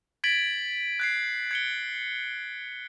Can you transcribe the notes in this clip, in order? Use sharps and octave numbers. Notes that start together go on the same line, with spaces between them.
G#6 A6 B6 D7 F#7
F#6 G#6 C7
G#6 C#7 G7